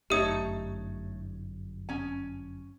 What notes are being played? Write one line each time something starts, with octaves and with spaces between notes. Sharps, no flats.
G1 F#2 A3 D#4 G4 C#5 D#6
C#4 G#5